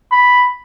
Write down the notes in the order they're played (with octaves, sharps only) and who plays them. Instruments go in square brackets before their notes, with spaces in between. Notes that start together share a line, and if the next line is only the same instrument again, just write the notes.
[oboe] B5